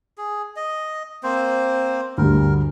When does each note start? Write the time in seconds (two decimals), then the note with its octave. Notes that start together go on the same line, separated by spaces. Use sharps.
0.18 G#4
0.56 D#5
1.23 A#3 C4 C5
2.18 D2 G2 A#4